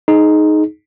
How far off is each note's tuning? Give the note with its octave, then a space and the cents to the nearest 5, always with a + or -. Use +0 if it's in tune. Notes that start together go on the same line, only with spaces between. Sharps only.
D#4 +0 G#4 +25